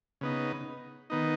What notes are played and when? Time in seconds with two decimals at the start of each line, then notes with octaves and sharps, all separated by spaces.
0.21 C#3 B3 D#4
1.10 D#3 B3 D#4